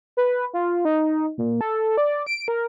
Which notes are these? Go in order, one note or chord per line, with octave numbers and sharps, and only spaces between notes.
B4
F4
D#4
A#2
A4
D5
D7
A#4